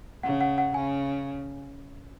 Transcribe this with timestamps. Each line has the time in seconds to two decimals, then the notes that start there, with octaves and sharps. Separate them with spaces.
0.23 C#3 F#5
0.41 F#5
0.58 F#5
0.74 C#3 G#5